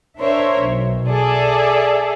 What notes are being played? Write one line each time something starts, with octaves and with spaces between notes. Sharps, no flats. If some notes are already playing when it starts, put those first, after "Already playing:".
D4 A#4 C5 C#5 E5
B1
G#4 A4 D5 E5